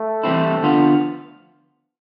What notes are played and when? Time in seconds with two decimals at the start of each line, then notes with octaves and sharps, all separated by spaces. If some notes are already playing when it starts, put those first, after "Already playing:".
Already playing: A3
0.23 C3 E3 G3 C4 E4
0.62 D3 F3 B3 F4